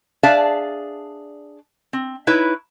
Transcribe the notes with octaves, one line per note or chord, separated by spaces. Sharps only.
D4 G#4 D5 E5 F5 A5
C4
D#4 E4 B4 C#5